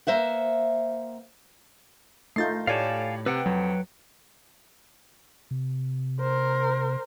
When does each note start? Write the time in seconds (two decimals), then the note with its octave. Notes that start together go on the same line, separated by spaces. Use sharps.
0.07 A#3 C5 E5 F#5
2.36 A3 D#4 F4 G6 A6 C7
2.67 A2 G4 C#5 D5 F5 G#5 A5
3.26 C3 B4 F#5 G5
3.46 F2 F#3
5.51 C3
6.20 A#4 C5